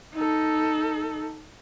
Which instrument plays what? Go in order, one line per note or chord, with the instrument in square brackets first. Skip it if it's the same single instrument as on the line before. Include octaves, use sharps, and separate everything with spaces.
[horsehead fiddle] D#4 A4